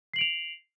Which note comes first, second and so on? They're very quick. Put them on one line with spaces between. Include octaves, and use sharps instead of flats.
C7 F#7 D7 F7